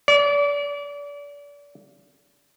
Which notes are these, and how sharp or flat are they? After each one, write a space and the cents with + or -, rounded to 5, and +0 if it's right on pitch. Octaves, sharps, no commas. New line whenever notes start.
D5 -35